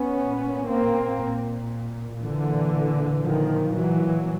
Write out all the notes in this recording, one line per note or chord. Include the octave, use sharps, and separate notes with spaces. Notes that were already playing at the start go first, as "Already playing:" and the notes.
Already playing: B3 C#4
A#2
A#3 C4
A#2
A#2 D3 E3
A#2 D#3 F3
E3 F#3